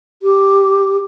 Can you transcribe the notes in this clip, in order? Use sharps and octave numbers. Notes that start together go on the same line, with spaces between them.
G4